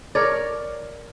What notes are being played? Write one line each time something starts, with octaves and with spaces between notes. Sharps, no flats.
A#4 C#5 D5